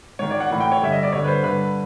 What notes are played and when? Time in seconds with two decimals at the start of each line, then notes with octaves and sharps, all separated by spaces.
0.19 G#2 D#3 C#5
0.31 D5
0.40 F#5
0.51 A2 E3 F#5
0.61 G5
0.72 C#5
0.81 G2 D3 E5
0.92 D#5
1.03 D5
1.12 G2 D3 C#5
1.24 B4
1.28 C5
1.43 G2 D3 B4